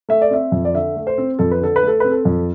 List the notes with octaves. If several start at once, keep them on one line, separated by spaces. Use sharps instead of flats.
A3 E5
D5
C4 E5
F2
D5
D3 E5
A3
C5
C4
F2 A4
B4
D3 A4
B4
A3 A4
C4 B4
A4
F2